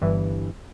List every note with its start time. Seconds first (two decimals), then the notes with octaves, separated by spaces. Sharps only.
0.01 G1 G2 E3